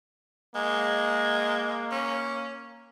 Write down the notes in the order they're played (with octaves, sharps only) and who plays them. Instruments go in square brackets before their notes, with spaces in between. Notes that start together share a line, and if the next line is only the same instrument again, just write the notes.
[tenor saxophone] G#3 [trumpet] A#3
[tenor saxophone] C#4